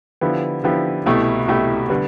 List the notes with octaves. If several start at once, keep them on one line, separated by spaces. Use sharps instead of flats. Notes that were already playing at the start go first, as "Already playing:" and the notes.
D3 F3 B3 E4 G4
D3 F3 B3 E4 G4
C2 B2 A3 E4 G4
C2 B2 A3 E4 G4
D3 G3 B3